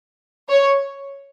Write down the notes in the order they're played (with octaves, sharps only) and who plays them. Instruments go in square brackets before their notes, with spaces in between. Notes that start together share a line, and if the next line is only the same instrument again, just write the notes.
[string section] C#5